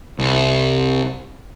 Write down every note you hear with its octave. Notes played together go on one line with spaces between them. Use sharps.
C2